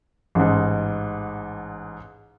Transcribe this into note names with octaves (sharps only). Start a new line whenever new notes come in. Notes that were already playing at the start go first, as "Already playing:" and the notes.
A1 G#2